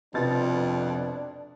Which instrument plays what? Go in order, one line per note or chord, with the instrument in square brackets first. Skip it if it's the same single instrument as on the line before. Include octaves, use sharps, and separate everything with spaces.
[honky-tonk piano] F1 B2 A6 [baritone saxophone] F2 [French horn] D4